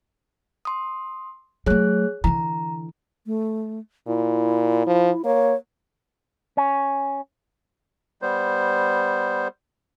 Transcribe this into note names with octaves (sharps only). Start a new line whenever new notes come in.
C6 D#6
F#3 A3 G#4 C#5 F#6
D3 E3 A#5
A3
A#2 E4
F3
A#3 C#5
C#4
G3 B3 C5